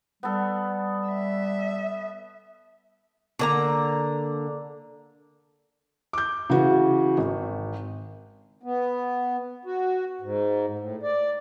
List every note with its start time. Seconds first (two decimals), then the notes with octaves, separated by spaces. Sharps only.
0.23 G3 B3 A4
1.07 E5
3.39 D3 A#3 A#5
6.13 D6 G6
6.50 C#3 E3 F#4
7.18 G#1
8.63 B3
9.65 F#4
10.21 G#2
10.79 A2
11.03 D5